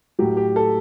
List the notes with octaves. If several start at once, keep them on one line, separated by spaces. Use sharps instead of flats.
A2 F#3 G4
G4
A4